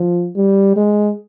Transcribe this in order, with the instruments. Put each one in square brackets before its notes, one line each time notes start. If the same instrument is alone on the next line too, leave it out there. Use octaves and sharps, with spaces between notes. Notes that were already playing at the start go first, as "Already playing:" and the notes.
Already playing: [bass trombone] F3
G3
G#3